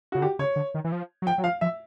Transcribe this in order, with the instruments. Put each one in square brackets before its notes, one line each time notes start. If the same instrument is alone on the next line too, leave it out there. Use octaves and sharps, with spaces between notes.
[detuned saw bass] C#3 [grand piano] F#4
[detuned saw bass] D3 [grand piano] G4
[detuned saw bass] C#3 [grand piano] C#5
[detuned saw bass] D3
D#3
E3
F3
F#3
[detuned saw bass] F3 [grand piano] G5
[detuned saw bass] F#3
[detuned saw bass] F3 [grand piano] F5
[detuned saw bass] F3 [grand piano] E5